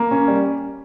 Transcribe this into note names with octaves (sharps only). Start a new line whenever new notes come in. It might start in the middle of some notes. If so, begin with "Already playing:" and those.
Already playing: A#3
C#4
G3